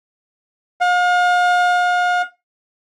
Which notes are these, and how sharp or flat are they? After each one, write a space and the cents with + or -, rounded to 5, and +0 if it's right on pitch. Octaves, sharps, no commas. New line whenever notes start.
F5 +40